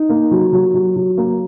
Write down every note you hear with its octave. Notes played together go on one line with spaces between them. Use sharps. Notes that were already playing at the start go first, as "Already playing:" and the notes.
Already playing: D#4
A#3
F#3
F#3
F#3
F#3
A#3